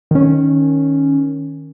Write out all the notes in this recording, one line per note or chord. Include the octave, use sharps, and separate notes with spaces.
D#3 C#4